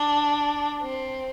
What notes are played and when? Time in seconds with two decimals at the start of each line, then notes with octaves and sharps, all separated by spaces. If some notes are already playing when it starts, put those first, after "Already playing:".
Already playing: D4
0.80 C4